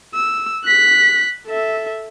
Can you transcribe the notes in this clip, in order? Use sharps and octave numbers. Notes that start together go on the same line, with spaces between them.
E6
F#6 B6
A4 E5